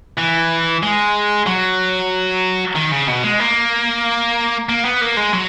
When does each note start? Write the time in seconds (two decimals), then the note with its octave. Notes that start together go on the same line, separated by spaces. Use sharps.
0.18 E3
0.83 G#3
1.47 F#3
2.76 D#3
2.92 C#3
3.08 B2
3.24 G#3
3.40 A#3
4.69 A#3
4.85 B3
5.01 A#3
5.17 G#3
5.33 F#3